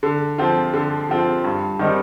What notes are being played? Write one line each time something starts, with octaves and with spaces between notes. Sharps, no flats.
D3
F3 C4 F4
D3
F3 C4 F4
G2
D#3 G3 C4 D#4